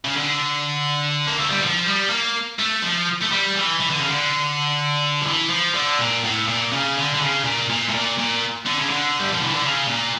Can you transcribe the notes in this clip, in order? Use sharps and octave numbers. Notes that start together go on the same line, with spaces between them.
C#3
D3
A#3
A3
G3
F3
G3
A#3
A3
F3
A3
G3
E3
E3
D3
C#3
D3
F3
E3
F3
D3
A#2
A2
A#2
C#3
D3
D3
C#3
A#2
A#2
A2
A#2
A#2
D3
C#3
D3
G3
F3
E3
D3
C#3
A#2